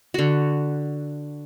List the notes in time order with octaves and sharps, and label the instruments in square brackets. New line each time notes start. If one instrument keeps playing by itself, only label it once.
[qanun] D3 F#4